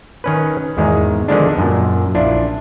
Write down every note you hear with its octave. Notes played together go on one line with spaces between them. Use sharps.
D#3 C#4 B4
E2 G#2 D#3 G#3
D3 D#3 F3 G#3 B3 D4
F#2 A#2
A#1 D4 E4 F4